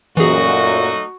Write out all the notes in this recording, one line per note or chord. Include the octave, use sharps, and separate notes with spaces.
F#2 A#2 E3 F#3 A3 D#4 F#4 G#4